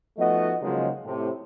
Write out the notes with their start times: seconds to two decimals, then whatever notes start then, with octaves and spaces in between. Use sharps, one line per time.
0.18 F3 A3 B3 D#4 F#4 D#5
0.61 C#3 F3 F#3 G#3 A#3 D#4
1.05 A2 C3